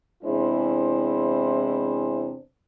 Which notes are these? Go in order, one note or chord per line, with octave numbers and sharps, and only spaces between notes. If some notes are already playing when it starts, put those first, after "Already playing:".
E2 C3 G#3 D4 E4 C5